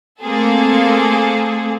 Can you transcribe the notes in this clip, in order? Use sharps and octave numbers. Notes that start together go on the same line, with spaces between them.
A3 A#3 C4 G#4 A4